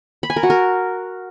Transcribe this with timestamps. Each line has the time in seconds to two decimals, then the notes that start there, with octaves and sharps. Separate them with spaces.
0.23 B5
0.30 G#5
0.36 A#4
0.43 F#4
0.50 A#4